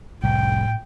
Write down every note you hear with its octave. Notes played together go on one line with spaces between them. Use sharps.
F1 C2 A2 G5